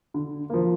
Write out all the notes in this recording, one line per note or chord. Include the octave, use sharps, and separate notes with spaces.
D3
F3 A#3